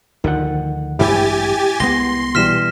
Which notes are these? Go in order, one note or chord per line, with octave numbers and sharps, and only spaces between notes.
D2 D3 D#3 F3 F#5
A1 G2 G#3 E4 G4 G#5 A6
C2 G#3 B3 C6 A#6 G7
B2 E3 G3 F6 B6 E7